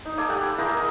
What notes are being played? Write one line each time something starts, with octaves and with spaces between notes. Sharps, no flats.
D#4
A4 D5 G#5 D6
G4 F#5
B5
E4 G#4 A#4 A#5
D#5 A#5